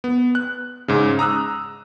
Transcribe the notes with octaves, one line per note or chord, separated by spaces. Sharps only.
B3
F#6
G#2 C#3
A#5 D#6 E6 F#6